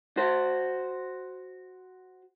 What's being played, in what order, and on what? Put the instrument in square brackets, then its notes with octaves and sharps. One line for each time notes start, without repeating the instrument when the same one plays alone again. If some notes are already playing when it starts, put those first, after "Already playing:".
[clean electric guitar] F#4 C5